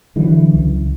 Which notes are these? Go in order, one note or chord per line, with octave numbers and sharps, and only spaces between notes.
D3 E3 F#3
C#2